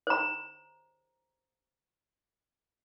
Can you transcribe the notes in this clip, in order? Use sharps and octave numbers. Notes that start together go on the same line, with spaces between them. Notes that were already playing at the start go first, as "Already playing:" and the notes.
C5 A#5